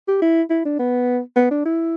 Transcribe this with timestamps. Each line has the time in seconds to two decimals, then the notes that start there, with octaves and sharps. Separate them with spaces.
0.08 G4
0.22 E4
0.50 E4
0.65 D4
0.79 B3
1.36 B3
1.51 D4
1.65 E4